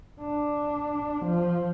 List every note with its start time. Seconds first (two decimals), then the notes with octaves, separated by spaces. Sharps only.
0.21 D4
1.25 F3